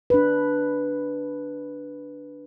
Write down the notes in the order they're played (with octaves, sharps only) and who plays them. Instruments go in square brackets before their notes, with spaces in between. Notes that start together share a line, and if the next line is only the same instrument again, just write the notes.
[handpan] D4 B4